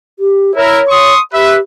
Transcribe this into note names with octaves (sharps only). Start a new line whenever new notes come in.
G4
E4 A#4 C#5
C6 C#6 D#6
G4 B4 E5